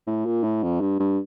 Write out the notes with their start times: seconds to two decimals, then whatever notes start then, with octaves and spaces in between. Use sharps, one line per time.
0.07 A2
0.26 A#2
0.44 A2
0.63 F2
0.81 G2
0.99 G2